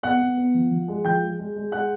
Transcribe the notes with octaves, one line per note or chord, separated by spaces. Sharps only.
B3 F#5 F#6
B3
B3
F3
F3
G#3
F3 G5 G6
G#3
G#3
G#3
G#3 F#5 F#6